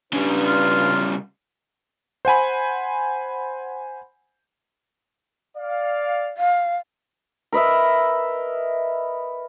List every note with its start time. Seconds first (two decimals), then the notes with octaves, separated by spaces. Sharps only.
0.13 C#3 G3 D4 B4
0.46 F4
2.25 C5 F#5 G#5 B5
5.58 D5 F5
6.37 F5
7.53 A#4 B4 D#5 E5